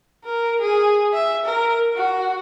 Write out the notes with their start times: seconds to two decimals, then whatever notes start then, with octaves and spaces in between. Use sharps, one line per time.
0.25 A#4
0.61 G#4
1.13 E5
1.45 A#4
1.96 F#4